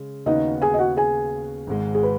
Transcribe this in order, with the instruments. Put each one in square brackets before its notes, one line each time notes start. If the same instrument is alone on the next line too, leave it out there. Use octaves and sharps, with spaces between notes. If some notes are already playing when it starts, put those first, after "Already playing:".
Already playing: [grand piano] C#3 G#3
[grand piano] D#2 C#3 B3 F#4 [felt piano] D#4 D#5
[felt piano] G#4 G#5
D#5
F#4 F#5
G#4 G#5
[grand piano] G#1 G#2 G#3
[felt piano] G#4
B4